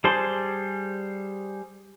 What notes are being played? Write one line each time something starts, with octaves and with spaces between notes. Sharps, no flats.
G3 G#4 C5 A5 C6